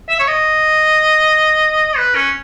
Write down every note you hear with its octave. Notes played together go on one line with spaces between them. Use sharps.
E5
C#5
D#5
B4
C#4